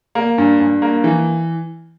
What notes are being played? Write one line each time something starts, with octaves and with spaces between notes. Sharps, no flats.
A#3
G2
G2
A#3
E3